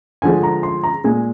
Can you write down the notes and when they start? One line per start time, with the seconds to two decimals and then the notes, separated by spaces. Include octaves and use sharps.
0.22 D3 F3 G#3 G#5
0.43 A#5
0.63 C6
0.84 A#5
1.04 A#2 G#3 G#5